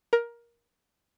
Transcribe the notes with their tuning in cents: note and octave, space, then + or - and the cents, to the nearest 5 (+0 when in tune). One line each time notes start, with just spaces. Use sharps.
A#4 +15